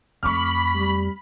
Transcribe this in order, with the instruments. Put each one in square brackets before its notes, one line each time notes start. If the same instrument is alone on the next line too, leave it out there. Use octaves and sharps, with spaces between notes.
[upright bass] F2 A3 [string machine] B5 [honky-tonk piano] C#6 D6 F6
[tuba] G3